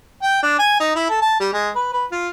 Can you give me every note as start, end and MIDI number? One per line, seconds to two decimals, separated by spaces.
0.23 0.43 79
0.43 0.57 62
0.59 0.76 80
0.80 0.95 63
0.96 1.09 64
1.10 1.20 69
1.22 1.40 81
1.40 1.49 55
1.53 1.70 56
1.75 1.91 71
1.93 2.05 71
2.12 2.29 65